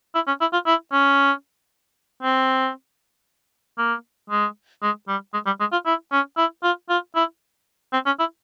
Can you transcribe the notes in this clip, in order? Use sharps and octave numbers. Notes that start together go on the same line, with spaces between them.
E4
C#4
E4
F4
E4
C#4
C4
A#3
G#3
G#3
G3
G#3
G3
G#3
F4
E4
C#4
E4
F4
F4
E4
C4
C#4
E4